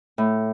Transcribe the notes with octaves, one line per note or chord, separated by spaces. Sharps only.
A2